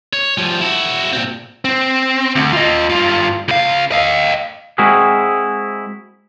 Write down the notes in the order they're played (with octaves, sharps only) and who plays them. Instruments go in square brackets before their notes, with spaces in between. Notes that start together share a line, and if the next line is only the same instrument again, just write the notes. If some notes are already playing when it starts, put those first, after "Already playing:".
[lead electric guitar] C#5
F3 G3
E4 F#4
A#2 C4
C4
D2
F4 D#5
G2 F4
C#2 F5
D#5 F5
[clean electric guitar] G#3 C4 E4 F#4 G#4 A#4